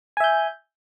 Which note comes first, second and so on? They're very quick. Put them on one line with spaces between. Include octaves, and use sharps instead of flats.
G#5 E5 G6